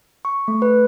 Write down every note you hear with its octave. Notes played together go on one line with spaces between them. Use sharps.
C#6
A3
B4